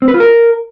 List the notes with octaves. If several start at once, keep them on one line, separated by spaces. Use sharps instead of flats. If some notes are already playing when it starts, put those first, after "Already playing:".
C4
B4
F4
A#4